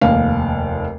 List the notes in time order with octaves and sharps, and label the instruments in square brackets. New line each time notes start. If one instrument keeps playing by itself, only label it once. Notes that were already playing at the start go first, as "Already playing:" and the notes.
[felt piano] F1 D#2 F5